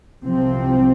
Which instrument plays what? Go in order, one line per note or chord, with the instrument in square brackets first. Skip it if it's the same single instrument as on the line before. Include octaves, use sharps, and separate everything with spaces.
[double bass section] C2 C3 F3 C4